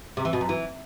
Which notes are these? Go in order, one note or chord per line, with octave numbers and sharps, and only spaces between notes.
C3
E3
B2
F#2
E3